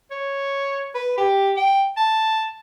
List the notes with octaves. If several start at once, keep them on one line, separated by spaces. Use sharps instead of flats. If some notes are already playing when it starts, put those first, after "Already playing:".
C#5
B4
G4
G5
A5